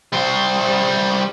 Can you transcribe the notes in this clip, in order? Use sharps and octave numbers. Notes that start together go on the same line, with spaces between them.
G3 C5